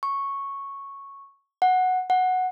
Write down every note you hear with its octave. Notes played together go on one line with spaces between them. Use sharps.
C#6
F#5
F#5